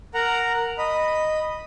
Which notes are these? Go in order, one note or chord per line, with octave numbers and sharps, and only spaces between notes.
A#4 F#5 A#5
D#5 B5